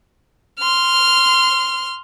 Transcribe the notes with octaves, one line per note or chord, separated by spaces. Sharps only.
C6 F6